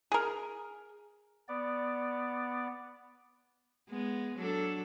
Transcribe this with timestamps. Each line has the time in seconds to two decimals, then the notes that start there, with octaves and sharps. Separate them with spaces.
0.12 G#4 A#4
1.48 B3 D5
3.90 G#3 B3
4.37 F#3 D4 A4